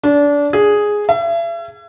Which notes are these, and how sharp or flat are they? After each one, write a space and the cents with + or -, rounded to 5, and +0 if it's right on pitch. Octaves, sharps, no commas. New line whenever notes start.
D4 -25
G#4 +0
E5 +40